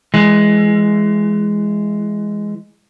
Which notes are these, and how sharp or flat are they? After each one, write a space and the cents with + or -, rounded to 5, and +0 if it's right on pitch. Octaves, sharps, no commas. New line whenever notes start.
E3 +20 G#3 +0